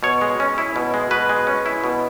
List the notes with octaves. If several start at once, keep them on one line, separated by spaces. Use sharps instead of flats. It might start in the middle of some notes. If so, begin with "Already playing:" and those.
B2 C#5
G#3
C#4
E4
B2
G#3
B2 B4
G#3
C#4
E4
B2